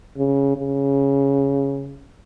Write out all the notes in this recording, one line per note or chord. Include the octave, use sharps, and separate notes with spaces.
C#3
C#3